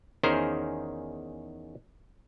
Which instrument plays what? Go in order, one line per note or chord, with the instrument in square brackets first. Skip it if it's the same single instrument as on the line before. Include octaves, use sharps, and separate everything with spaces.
[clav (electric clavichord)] E2 D#3 C#4 G#4 A#4 C5